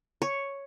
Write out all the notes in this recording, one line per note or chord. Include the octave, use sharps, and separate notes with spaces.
C#5